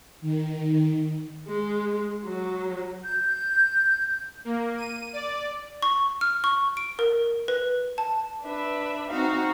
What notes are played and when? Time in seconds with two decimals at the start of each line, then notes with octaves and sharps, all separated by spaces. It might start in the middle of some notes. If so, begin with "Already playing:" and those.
0.21 D#3
1.48 G#3
2.25 F#3
3.04 G6
4.45 A#3
4.78 D#7
5.13 D5
5.82 C#6
6.21 F6
6.44 C#6
6.77 D7
6.99 A#4
7.48 B4
7.98 A5
8.42 D4 B4 E5
9.10 C4 D#4 F#4 F5